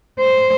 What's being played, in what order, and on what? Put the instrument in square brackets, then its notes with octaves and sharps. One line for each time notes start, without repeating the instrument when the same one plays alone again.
[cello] C5